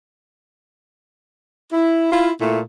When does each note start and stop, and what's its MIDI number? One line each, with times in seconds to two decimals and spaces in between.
1.73 2.09 64
2.11 2.30 64
2.11 2.30 65
2.39 2.59 46
2.39 2.59 57
2.39 2.59 64